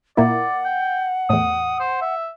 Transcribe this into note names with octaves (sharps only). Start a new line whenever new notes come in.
A#2 A#3 E4 D5 F#5
G5
E2 A2 D#6
C5
E5